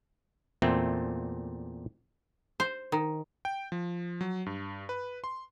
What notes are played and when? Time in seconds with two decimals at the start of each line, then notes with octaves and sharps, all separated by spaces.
0.62 E2 A#2 A3 C4
2.60 C5
2.92 D#3
3.45 G5
3.72 F3
4.21 F#3
4.46 G2
4.89 B4
5.24 C6